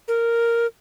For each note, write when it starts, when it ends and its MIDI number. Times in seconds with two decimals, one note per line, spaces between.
0.08 0.67 70